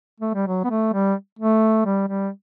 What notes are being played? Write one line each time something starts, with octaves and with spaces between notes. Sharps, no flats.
A3
G3
F#3
B3
A3
G3
A3
G3
G3